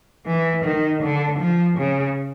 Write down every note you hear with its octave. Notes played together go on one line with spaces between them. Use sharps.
E3
D#3
D3
F3
C#3